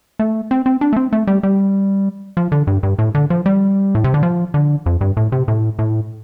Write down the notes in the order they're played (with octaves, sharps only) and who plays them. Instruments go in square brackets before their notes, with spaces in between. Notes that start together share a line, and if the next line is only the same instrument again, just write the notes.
[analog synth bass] A3
C4
C4
D4
A3
C4
A3
G3
G3
F3
D3
G2
G2
A2
D3
F3
G3
A2
C3
D3
F3
D3
F2
G2
A2
C3
A2
A2